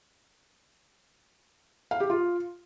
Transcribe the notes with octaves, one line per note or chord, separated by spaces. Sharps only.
F5
G4
F4